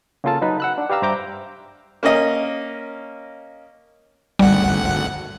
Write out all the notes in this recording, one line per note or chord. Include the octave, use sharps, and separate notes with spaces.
C#3 A#3 C#4 F4 A4 A5
F#3 D#4 B4
F#5 E6 F#6
D4
G4 B4 D5 F5 A#5 E6
G2 C5 E5 A#5 D6 G6
A#3 C#4 D#5
G#1 D2 G3 F#5